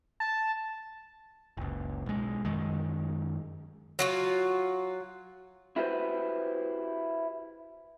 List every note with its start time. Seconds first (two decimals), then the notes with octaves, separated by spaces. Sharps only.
0.20 A5
1.57 F#1 C#2
2.06 B1 G#3
2.45 F#2 D#3 G#3
3.99 F#3 F4 F#4
5.76 E4 F#4 G4 B4 C5